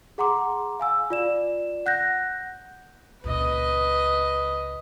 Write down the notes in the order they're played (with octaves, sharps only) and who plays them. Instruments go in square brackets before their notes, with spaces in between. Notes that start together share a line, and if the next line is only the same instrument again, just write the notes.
[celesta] G#4 F#5 A#5 C6 D6
F5 G#5 E6
F4 D5 E7
F#5 F#6 G6 A#6
[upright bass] C#2 A#2 [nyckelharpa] B4 D#5